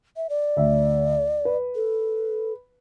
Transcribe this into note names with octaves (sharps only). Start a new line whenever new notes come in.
E5
D5
D2 E5
B4
A4